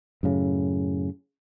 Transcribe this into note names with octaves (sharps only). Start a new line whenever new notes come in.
F#2 A2 C#3